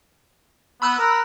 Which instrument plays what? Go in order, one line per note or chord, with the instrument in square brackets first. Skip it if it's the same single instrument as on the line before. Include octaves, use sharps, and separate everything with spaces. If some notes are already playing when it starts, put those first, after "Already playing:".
[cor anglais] B3 [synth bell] B5 E6 F#6
[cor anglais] A#4